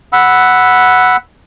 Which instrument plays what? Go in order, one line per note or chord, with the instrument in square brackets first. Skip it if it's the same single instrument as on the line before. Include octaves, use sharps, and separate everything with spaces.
[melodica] F#5 B5 E6